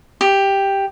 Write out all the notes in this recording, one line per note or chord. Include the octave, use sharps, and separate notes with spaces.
G4